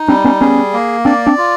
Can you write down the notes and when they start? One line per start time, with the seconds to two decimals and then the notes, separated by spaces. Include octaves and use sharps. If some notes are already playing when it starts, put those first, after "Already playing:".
Already playing: D#4
0.08 G3 C4 D4
0.24 B3 C#4
0.41 B3 C#4 G#4
0.73 A#3
1.05 C4 D4 D5
1.26 C4 D4
1.38 F4